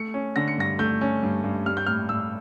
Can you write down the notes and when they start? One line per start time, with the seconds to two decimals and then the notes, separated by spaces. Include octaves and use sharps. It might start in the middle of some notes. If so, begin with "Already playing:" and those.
Already playing: A3 C#7
0.14 C#4
0.36 D3 A#6
0.48 C#7
0.58 G2 A#6
0.79 A3 G6
1.01 C#4
1.23 G2
1.44 G2
1.66 G3 F6
1.77 G6
1.86 A2 F6
2.09 A2 E6